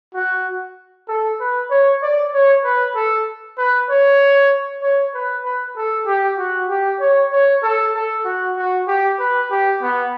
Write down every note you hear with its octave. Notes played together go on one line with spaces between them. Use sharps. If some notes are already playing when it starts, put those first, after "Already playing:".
F#4
A4
B4
C#5
D5
C#5
B4
A4
B4
C#5
C#5
B4
B4
A4
G4
F#4
G4
C#5
C#5
A4
A4
F#4
F#4
G4
B4
G4
B3